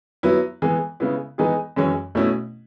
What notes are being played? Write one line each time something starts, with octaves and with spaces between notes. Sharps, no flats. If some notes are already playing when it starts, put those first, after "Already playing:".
F#3 B3 E4
E3 G#3 B3
C#3 G#3 B3 E4
E3 G#3 B3 D#4 G#4
F#2 E3 G#3 C#4
B2 A3 C#4 E4